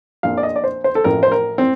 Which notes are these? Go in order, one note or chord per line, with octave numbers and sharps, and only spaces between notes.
A#1 A#2 F3 F5
D5
D#5
D5
C5
C5
A4
A1 A2 F3 A#4
C5
A#4
C4